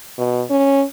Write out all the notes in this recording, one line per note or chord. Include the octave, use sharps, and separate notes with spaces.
B2
C#4